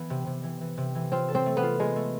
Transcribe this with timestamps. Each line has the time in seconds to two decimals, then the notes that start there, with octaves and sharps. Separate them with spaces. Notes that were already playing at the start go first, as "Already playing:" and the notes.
Already playing: E3 B3
0.10 C3
0.27 C3
0.44 E3
0.61 E3
0.78 C3
0.95 E3
1.12 C4 F4
1.29 A4
1.35 C4
1.46 A3
1.57 B3
1.63 F4
1.80 G#3 F4
1.96 A3